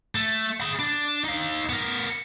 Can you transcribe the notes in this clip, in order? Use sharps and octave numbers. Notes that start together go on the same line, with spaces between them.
A3
G#4 B5
D4
D#4 F5
B3 A#4